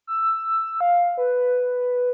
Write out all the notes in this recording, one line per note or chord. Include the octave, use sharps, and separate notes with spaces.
E6
F5
B4